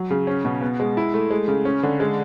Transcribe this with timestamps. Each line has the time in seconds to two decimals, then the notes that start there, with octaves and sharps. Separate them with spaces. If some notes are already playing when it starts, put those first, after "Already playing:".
Already playing: F#3
0.10 C#3
0.27 C#4
0.45 B2
0.61 B3
0.80 G#3
0.97 E4
1.14 A3
1.31 G#3
1.48 C#3
1.65 C#4
1.83 D3
2.00 G#3